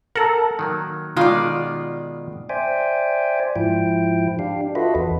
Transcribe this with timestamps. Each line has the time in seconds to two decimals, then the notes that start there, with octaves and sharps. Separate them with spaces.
0.16 A4 A#4 F#5
0.59 D#3 F#3 A#3
1.17 B2 D#3 G#3 F4 D5
2.50 C5 D5 E5 G5 G#5
3.56 G#2 F3 E4 G5
4.39 D4 G4 F5
4.75 F4 F#4 A4 B4 D#5 E5
4.95 E2